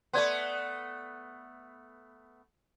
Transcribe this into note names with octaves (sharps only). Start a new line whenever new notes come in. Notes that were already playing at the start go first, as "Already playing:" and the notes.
A3 B3 D5 C6